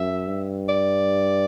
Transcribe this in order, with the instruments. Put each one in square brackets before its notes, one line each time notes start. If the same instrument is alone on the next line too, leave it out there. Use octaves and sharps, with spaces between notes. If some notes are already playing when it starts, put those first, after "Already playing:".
Already playing: [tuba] F#2 [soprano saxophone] E5
[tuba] G2
[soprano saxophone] D5